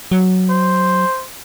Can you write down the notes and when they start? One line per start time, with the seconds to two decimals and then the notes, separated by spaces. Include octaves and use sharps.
0.12 F#3
0.50 C5